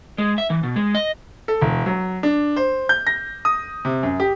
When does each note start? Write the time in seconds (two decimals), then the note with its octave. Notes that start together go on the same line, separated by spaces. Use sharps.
0.18 G#3
0.38 E5
0.50 E3
0.63 B2
0.76 G#3
0.95 D#5
1.48 A4
1.61 E1
1.86 F#3
2.23 D4
2.56 C5
2.89 G6
3.07 A#6
3.45 D#6
3.85 C3
4.03 F#2
4.20 G4